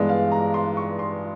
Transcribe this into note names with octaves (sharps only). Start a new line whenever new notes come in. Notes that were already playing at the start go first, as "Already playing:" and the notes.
Already playing: G2 E3 G#3 B3 D5
F5
A#5
C6
C#6
C6